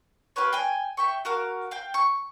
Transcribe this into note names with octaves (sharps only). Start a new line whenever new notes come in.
F4 G4 B4 C#5
G5 G#5
E5 G5 C#6
F#4 A#4 F5
F5 G5
C#6